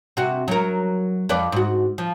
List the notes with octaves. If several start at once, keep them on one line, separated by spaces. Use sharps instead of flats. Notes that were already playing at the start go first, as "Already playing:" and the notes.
C3 F#4
F#3 A#4
F2 B4 D5
G#2 F#4
F3